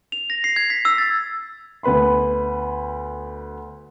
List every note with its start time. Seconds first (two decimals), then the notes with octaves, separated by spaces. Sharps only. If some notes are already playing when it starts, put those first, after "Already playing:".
0.12 F7
0.30 A#6
0.44 C7
0.56 G#6
0.70 B6
0.85 E6
0.98 A6
1.83 D2 B3 B4 B5 C6